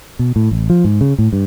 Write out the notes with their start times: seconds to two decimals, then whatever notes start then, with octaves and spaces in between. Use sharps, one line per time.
0.19 B2
0.36 A2
0.51 A1
0.70 F3
0.84 G#2
1.01 C#3
1.18 A2
1.33 G2